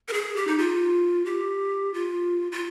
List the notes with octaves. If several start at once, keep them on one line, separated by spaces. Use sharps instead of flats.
A#4
G#4
G4
D#4
F4
G4
F4
F4